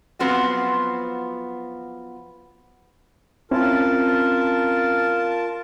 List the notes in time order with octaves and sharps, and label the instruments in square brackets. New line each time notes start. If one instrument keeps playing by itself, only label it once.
[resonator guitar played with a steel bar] F3 F#3 B3 C4 F4 F#4
[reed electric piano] C4 C#4 E4 [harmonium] F4 A#4 A5